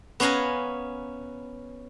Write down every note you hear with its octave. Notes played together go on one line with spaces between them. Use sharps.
B3 C#4 B4 F5 G#5 A#5